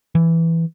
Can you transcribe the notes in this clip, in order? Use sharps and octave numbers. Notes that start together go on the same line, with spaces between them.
E3